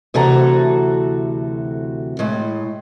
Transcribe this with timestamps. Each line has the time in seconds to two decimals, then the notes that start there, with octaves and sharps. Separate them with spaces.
0.14 D2 C3 E3 F#4 A4 A#5
2.19 A2 G#3